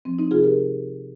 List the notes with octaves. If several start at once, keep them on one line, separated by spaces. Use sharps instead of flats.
F3 C4
C4 D#4
C3 F4 G#4
G4 A#4